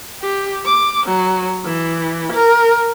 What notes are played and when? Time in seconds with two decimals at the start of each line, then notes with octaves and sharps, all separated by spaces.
0.22 G4
0.66 D6
1.06 F#3
1.65 E3
2.32 A#4